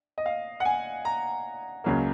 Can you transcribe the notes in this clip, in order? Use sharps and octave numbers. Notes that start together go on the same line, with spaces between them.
D#5
F5
F#5
G#5
A#5
C#2 C#3 F#3 A#3